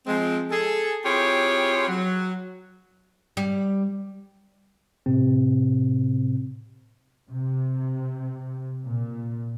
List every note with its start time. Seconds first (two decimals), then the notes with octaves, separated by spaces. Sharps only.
0.06 F3 G#3 C4
0.51 G#4 A4
1.04 C4 E4 F4 G4 G#4 C#5
1.88 F#3
3.37 G3
5.06 A2 C3 C4
7.29 C3
8.84 A#2